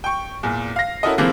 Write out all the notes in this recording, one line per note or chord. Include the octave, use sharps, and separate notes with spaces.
G5 C#6
E2 A#2
F5 A#6
C#4 E4 F#4 A4 A#4 D#5
C3 E3 F3 G#3 A#3 C4